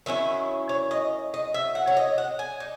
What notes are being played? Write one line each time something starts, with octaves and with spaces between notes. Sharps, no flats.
D#3 F#3 C#4 E4 E5
C#5
D#5
D#5
E5
F#5
C#5
D#5
F#5
G#5
D#4